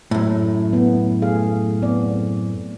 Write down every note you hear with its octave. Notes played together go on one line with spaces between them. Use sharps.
F#2 A2
B3
A3 G#4 F5
B3 C4 D5